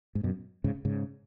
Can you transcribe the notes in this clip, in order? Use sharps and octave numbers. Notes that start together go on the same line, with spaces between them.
G#2
F#2 B2
G#2 C#3
G#2 C#3